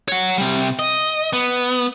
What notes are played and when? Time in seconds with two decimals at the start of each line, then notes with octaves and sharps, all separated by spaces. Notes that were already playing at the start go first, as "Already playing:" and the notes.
0.08 C#5 F#5
0.38 C3 G3
0.79 D#5
1.33 B3